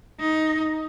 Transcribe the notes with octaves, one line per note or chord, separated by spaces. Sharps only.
D#4